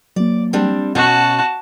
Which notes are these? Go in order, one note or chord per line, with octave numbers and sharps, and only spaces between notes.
F#3 A#3 D5
G3 C4 D4
B2 C#4 F#4 F#5 A5